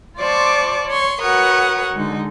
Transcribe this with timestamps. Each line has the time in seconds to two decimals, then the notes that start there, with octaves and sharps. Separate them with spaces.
0.17 F4 C5 D5 A5 C#6 D6
0.88 C#5 C6 C#6
1.22 F#4 A#4 B4 C#5 F#5 D#6
1.94 D3 G#3 D#4